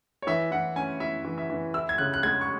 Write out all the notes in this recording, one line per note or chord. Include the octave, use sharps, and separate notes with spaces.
C#5
E3 E5
E3 F#5
C#4 G#5
E4 E5
E3
E5
E3
E4 E6
G#6
C#3 F#6
F#6
G#3 G#6
C#6